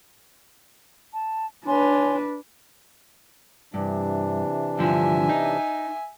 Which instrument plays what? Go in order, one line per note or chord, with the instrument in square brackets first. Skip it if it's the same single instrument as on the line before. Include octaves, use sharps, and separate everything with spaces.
[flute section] A5
[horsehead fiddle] D4 B4 [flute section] C#5 G#5 C6
[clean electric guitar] G2 [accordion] C3 E3 D4
[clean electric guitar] G2 D3 F3 [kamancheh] E5 G#5
[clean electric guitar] D#4